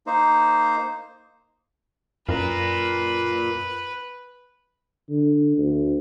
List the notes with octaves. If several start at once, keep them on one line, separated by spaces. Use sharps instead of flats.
A#3 D#4 C5
F#2 F4 A#4 B4
D3
D2